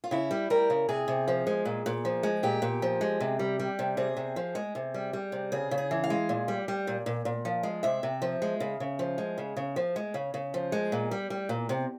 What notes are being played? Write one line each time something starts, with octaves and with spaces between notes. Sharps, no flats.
F4
C#3 E4
G3
G3 A#4
C#3
C3 G#4
C3
F3
G#3
A#2
A#2
F3
G#3
A#2 G4
A#2
F3
G#3
C3
G3
G3
C3
C3 G#4
C3
F3
G#3
C3
G3
G3
C3
C#3 G#4
C#3
G#4
E3
F5
G#3
A#2
G3
G3
A#2
A#2
A#2
F3
G#3
C3 E5
C3
F3
G#3
C#3
C#3
F3
G#3
C#3
C#3
F3
G#3
C#3
C#3
F3
G#3
A#2
G3
G3
A#2
C3